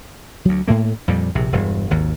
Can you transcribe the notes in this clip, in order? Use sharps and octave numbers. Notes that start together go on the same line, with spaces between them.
D2 F#3
A2 A3 A#3
F2 A#2 G3
A#1 C3
E1 G2
G#1 D#2